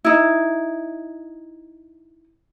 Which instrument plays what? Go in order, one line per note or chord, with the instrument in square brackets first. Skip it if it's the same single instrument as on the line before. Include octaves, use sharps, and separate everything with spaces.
[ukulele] D#4 E4